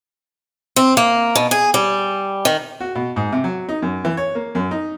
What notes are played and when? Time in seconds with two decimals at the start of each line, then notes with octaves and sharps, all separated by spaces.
0.76 C4
0.97 A#3
1.35 B2
1.51 G#4
1.74 G3
2.45 D#3
2.80 F#4
2.95 B2
3.16 G#2
3.32 C3
3.44 F#3
3.69 D#4
3.82 F#2
4.05 E3
4.17 C#5
4.35 A#3
4.55 F#2
4.71 D#4